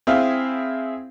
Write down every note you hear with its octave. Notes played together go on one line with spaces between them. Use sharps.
C4 E4 G#4 F5